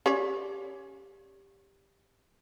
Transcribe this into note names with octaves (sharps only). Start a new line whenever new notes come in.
C#4 G4 C#5 D5